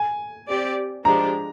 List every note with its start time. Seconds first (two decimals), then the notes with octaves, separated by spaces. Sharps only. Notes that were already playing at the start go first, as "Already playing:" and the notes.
Already playing: G#5
0.48 C4 G4 D5
1.05 F3 G#3 D4 G4 A#5